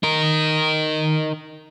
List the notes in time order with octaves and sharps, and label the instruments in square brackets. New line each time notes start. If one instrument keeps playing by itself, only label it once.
[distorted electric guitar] D#4 A#4